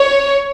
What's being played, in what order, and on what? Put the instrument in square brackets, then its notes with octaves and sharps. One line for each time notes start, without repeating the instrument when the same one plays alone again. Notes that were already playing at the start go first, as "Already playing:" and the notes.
Already playing: [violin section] C#5